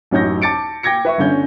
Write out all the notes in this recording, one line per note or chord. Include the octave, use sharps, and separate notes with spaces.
A1 F#2 D#4 C#5 G6 A#6
A5 D6 A6 C#7 D7
G5 D6 G#6 A#6 C#7
B4 E5 C#6
G1 D3 C#4 G6